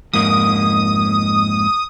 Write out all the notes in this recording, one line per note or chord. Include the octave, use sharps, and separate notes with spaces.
F2 G#2 A#3 D#6